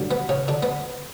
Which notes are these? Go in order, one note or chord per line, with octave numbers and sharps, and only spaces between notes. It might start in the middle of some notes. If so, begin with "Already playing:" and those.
Already playing: G2 D3 F#3
B3
C#3 C#4
D3 D4
B3